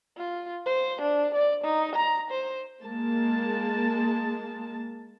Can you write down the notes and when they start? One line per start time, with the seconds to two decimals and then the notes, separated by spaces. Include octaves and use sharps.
0.17 F4
0.66 C5
1.02 D4
1.35 D5
1.64 D#4
1.95 A#5
2.31 C5
2.84 G#3 A#3 A5